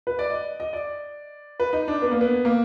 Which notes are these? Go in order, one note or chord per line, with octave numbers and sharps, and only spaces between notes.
B4
D5
D#5
D#5
D5
B4
D#4
D4
B3
A#3
B3
A#3